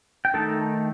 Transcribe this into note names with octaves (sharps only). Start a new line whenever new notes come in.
G5
D#3 A3 D#4 A4 A5